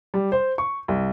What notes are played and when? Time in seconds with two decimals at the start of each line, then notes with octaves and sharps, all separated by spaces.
0.14 G3
0.32 C5
0.58 C#6
0.88 C2